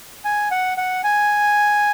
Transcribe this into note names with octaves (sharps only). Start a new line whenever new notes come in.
G#5
F#5
F#5
G#5